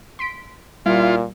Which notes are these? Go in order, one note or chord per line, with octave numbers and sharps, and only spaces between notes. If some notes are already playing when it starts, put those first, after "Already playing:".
C6 B6 D7
A#2 G3 E4 F4